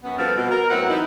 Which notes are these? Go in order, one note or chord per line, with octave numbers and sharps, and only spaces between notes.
F#2 B3
F3 G3 B3 C4 A4 A#4
B2
A#4
A2 F#3 B3 C4 E4 F#5
E3 D#4 E4